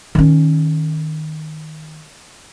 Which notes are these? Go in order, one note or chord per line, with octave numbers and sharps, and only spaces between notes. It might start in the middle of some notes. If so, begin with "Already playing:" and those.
D#3 C#4